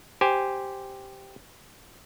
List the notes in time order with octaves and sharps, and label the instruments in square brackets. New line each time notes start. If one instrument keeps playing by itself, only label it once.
[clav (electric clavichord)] G4 C5 G#5